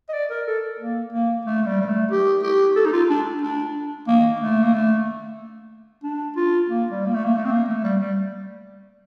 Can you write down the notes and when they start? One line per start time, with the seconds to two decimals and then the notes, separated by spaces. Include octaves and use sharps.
0.09 D#5
0.13 D5
0.31 A#4
0.47 A4
0.79 A#3
1.12 A#3
1.46 A3
1.62 A3
1.66 G3
1.81 G3
1.88 A3
2.11 G4
2.43 G4
2.76 A4
2.86 D#4
2.93 F4
3.10 D4
3.42 D4
4.08 A#3
4.40 A3
4.63 A#3
4.73 A3
6.04 D4
6.36 F4
6.69 A#3
6.91 G3
7.06 A#3
7.14 A3
7.24 A#3
7.36 A3
7.45 C4
7.51 A#3
7.68 A3
7.84 G3
8.00 G3